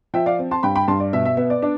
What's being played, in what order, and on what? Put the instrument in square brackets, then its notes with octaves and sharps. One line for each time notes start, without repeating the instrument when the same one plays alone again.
[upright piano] F3 E5 G5
D5 F5
C4
A5 C6
G2 G5 B5
G5 B5
G2 A5 C6
D5
B2 E5
E5
B3 E5
D5
D4